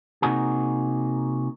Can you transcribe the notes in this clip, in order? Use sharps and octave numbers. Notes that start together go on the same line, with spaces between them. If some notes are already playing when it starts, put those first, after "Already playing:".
C3 A#3 D#4 F#4 G#4